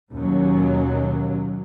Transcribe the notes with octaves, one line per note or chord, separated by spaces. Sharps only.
D#2 B2 F#3 C#4